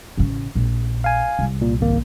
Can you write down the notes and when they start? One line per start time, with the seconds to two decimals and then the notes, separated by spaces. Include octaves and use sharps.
0.17 A1 C#3
0.55 A#1
1.04 F5 G#5
1.39 C2
1.61 A#2
1.81 G#1 A#3